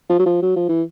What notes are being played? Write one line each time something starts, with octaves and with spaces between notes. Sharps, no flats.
F3
F#3
F3
F#3
F3
E3